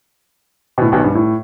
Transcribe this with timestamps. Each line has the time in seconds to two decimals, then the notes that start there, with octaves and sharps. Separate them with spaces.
0.78 B2
0.81 A2
0.92 B1 B2
1.04 G2
1.15 A2